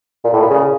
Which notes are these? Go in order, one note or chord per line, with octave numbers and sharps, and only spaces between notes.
A#2
A2
A#2
C#3